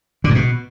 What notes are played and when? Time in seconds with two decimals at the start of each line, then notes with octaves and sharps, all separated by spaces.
0.24 D3
0.30 G#2
0.35 B2